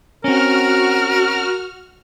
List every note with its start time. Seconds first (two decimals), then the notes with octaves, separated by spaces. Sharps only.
0.24 C4 C#4 F#4 A#4 F6